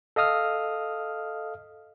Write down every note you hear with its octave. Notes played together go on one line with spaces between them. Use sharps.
A4 D#5 F5 D#6 F6